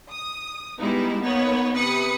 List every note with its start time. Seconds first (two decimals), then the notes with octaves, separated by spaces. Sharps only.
0.10 D#6
0.81 G3 G#3 B3 D#4 E4
1.23 A#3 B3 D#4 B4 C#5 F#5
1.74 C3 B4 D#6 C#7